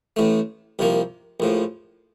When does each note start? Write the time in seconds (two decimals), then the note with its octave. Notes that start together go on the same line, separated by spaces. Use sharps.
0.16 A1 A2 A3
0.79 C2 C3 F3 A#3
1.40 A#1 A2 F3